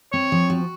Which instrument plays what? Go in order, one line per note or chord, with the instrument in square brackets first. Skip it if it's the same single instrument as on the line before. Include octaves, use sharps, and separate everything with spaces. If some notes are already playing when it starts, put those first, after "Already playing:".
[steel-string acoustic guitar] C4 [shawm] C#5
[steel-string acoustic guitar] F3
F#4